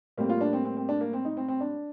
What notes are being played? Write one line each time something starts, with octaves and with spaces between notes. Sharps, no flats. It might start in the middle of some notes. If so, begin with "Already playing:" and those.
A2 G3 A#3 C4
F4
D4
C4
C4
C4
D4
A#3
C4
D#4
C4
C4
D4